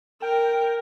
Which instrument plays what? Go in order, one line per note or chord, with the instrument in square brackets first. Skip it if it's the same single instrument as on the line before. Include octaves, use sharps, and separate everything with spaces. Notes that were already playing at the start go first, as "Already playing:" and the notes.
[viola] A#4 [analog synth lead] G5